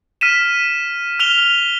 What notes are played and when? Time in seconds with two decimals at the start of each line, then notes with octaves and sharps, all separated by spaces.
0.21 F6 B6 D#7 E7
1.19 F6 F7 G7